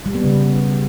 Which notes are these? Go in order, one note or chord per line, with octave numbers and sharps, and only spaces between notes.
G3
B3
C#3